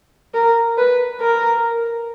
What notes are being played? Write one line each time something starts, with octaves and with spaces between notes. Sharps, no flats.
A#4
B4
A#4